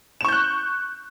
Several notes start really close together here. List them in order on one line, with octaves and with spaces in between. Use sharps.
E7 C#6 G6 F#6